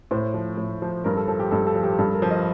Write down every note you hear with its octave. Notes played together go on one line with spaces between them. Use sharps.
A2 C5
F3
A2
F3
G2 A#4
A4
F3 A4
G4
G2 A4
A4
F3
G4
G2 A4
A#4
F3
D#5